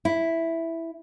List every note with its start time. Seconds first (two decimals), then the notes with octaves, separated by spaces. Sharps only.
0.05 E4